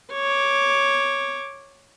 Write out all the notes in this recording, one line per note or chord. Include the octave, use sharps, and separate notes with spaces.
C#5 D6